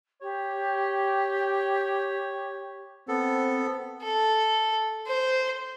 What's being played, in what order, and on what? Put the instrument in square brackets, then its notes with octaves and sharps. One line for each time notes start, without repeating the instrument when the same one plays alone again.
[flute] G4 [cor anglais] C#5
[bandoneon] B3 A4 [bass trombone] C4
[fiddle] A4
C5